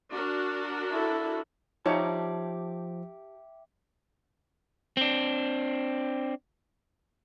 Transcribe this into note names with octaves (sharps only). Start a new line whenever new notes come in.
D4 F#4 A#4
E4 A4
F3 D#4 G4 C#5 E5 G5 A5 D6
C4 D4